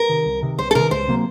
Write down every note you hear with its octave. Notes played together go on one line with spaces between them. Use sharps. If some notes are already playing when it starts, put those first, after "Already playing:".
Already playing: A#4
C3 D#3
C2
C3 D#3
C2 C5
A4
C3 D#3 A#4
C#2 C5
C3 F#3 A#3